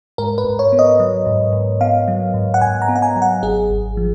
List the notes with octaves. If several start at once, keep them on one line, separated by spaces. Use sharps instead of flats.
G#2 A#4
B4
G#2
C#5
B3
D#5
F#3
G#2
G#2
B3 F5
F#3
G#2
F#5
G#2 G#5
A#5
B3
F#5
G#5
F#3
F#5
G#1 G#4
G#1
F3